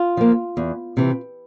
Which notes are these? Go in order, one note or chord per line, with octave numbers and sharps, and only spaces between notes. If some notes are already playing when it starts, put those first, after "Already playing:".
Already playing: F4
F3 A#3
E2
C3 E3